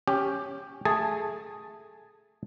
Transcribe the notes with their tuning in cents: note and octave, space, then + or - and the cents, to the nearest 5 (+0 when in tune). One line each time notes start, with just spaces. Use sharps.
C#4 +0 G4 +10
A3 +0 G#4 +0 A5 +0